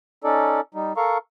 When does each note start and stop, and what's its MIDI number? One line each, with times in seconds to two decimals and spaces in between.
0.24 0.61 61
0.24 0.61 63
0.24 0.61 69
0.24 0.61 74
0.74 0.93 55
0.74 0.93 63
0.97 1.18 69
0.97 1.18 70
0.97 1.18 77
0.97 1.18 82
0.97 1.18 85